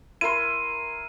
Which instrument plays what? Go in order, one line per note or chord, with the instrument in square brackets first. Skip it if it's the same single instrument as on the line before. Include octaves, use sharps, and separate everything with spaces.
[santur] E4 A#4 C6 [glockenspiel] D#7